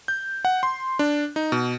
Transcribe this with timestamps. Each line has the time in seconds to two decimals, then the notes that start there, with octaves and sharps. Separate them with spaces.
0.08 G6
0.45 F#5
0.63 C6
0.99 D4
1.36 D#4
1.52 B2